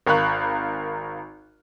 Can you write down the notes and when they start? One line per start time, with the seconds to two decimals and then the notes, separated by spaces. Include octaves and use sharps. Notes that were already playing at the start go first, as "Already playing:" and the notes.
0.07 G#1 A#4 F5 B5 C#6 F#6